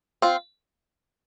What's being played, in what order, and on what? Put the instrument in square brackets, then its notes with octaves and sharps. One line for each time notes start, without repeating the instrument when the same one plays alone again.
[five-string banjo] C4 F4